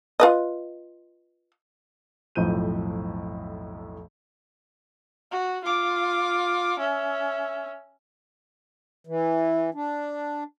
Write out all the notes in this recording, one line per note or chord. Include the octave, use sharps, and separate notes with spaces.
F4 B4 D#5
B1 F2 A2 F3 G6 D#7
F#4
F4 D6
C#4 E5
E3
D4